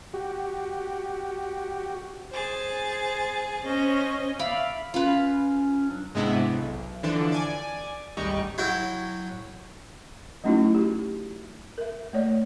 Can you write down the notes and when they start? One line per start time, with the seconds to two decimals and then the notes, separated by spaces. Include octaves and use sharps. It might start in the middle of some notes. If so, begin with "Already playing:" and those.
0.14 F#4 G4
2.32 G#4 C5 A6
3.65 C#4 C5 D#5
4.39 D5 E5 F5 B5
4.94 C#4 F4 B4
5.88 F#3 D4
6.15 G#2 C3 G#3 B3 D4 E4
6.54 B1
7.03 D3 E3 F3 D4 A4
7.32 D5 G#5
8.17 G#1 D2 G3 D#4 G4 C#6
8.58 F#3 E4 G5
10.44 F#3 A3 C#4 D#4 E4 F#4
10.75 F#4 G4
11.78 A#4 E5
12.13 A3 C#5 D5